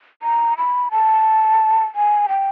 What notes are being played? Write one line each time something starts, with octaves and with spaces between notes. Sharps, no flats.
A#5
B5
A5
G#5
G5